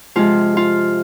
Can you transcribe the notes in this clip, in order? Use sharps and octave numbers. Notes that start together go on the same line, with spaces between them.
C3 F3 G#3 F4
F4